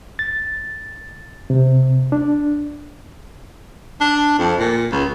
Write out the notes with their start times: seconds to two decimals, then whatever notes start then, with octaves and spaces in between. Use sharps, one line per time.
0.19 A6
1.50 C3
2.12 D4
4.00 D4
4.38 F2
4.59 A#2
4.92 C#2